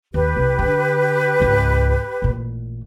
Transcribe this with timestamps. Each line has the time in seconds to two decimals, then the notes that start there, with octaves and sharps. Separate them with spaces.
0.14 D#2 G4 B4
0.36 C2
0.59 D3 D4
1.40 C#2 G#2
2.22 A1 A#2